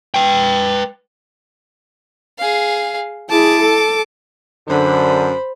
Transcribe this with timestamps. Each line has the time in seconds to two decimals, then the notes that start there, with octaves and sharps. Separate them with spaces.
0.14 B4 G5
2.38 G#4 F5
3.30 E4 G#4 A5 D6
3.62 A4
4.68 F#2 D3 C5 B5